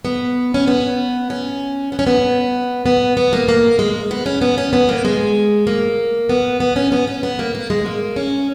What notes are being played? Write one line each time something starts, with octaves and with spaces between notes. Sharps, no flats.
B3
C#4
B3
C#4
B3
C#4
B3
B3
B3
A#3
A#3
G#3
B3
C#4
B3
C#4
B3
A#3
G#3
A#3
B3
B3
C#4
B3
C#4
B3
A#3
A#3
G#3
A#3
C#4